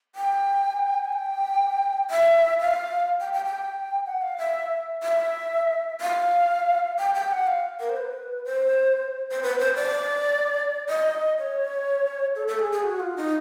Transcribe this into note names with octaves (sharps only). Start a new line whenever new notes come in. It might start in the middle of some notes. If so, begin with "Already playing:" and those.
G5
G#5
G5
E5
F5
G5
G5
G5
F#5
F5
E5
E5
F5
G5
G5
F#5
F5
A#4
C5
B4
C5
C5
B4
C5
D5
D#5
C#5
A4
A4
G#4
G#4
F#4
F4
D#4